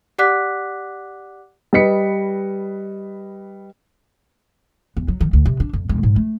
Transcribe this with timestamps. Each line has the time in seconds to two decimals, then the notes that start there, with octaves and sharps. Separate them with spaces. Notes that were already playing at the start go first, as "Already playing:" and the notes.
0.18 G4 D5 F#5 D6 F#6 B6
1.73 G3 B4 D#5 B6 C#7
4.97 E2
5.08 F#3
5.20 D#3
5.33 D2
5.45 C3
5.60 D4
5.73 F2
5.89 E1
6.03 G#2
6.16 A3